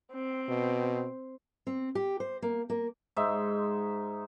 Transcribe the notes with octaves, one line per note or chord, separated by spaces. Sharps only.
C4
B2
C4
G4
C5
A#3
A#3
G#2 D#4 E5 C6